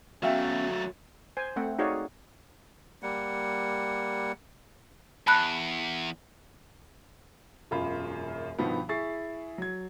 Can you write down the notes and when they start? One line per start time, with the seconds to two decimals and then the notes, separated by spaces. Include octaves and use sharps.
0.23 F#3 A3 B3 C#4 F#4 E5 F5 G5
1.37 C5 G#5
1.56 A3 C4 F#5
1.79 D#4 F#4 G#4 C#5 D5 F5
3.03 G3 A#3 F#5
5.27 E2 A5 B5 F#6
7.71 E1 F#2 F4 B5
8.58 G2 B2 D#3 F3 B3
8.89 E4 G#4 C#6 A6 C7
9.58 F#3 G#6